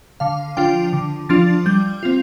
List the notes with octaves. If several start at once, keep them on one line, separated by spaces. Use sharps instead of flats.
D3 F5
F3 D4 F4 G5
D3
F3 D4 F4 A6
G3 G6
C4 F4